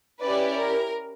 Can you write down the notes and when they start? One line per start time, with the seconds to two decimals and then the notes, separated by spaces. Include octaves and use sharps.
0.21 C#4 E4 G4 B4 D5
0.58 A#4